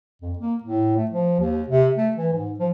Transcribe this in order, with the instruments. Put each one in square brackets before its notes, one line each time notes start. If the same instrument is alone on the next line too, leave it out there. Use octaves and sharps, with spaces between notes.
[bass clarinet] F2
A#3
A2
A3
F3
D#2
C3
A3
E3
G#2
F3